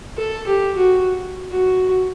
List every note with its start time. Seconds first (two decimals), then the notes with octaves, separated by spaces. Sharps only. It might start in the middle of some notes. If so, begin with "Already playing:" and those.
0.17 A4
0.47 G4
0.76 F#4
1.51 F#4